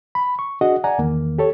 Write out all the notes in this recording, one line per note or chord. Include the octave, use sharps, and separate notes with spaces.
B5
C#6
D4 F#4 G#4 D#5 F#5
D5 F#5 G#5 A#5
E2 D#3 A#3
G4 A4 C#5